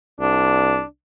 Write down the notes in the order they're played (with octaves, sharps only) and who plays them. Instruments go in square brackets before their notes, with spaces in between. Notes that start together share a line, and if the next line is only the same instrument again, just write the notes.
[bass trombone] C2 [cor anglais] D4